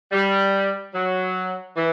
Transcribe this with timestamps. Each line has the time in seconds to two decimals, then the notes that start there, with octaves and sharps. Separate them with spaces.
0.12 G3
0.95 F#3
1.77 E3